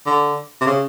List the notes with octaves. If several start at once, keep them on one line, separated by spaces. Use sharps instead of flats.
D3
C3
C#3